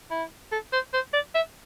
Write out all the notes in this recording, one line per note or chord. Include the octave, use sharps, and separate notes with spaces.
E4
A4
C5
C5
D5
E5